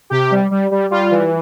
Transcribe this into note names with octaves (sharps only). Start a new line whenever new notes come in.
C3 G4
G3
G3
G3
G3 F4
E3